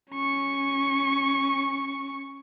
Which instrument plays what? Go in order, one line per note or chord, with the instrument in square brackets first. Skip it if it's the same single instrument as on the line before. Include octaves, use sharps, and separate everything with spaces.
[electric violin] C#4 C#6